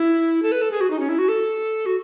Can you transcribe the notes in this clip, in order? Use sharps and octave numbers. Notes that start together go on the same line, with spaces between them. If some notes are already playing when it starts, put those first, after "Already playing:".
Already playing: E4
A4
B4
A4
G#4
F#4
D#4
C#4
E4
F#4
A4
F#4